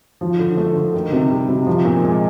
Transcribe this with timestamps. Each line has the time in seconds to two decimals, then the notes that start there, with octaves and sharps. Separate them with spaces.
0.21 F3
0.39 D3
0.57 A3
0.76 D3
0.94 D#3
1.12 C3
1.30 G3
1.49 C3
1.67 F3
1.85 A#2
2.04 G#3